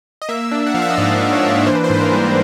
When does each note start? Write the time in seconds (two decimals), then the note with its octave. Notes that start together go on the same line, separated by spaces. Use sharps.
0.22 D#5
0.29 A#3 E5
0.51 D4
0.66 F#5
0.74 F3 F5
0.82 E5
0.90 D#5
0.98 G#2 D5
1.21 A#3
1.32 C#5
1.44 D4
1.66 E3 C5
1.75 B4
1.84 C5
1.90 G#2 B4
2.01 A#4
2.12 G3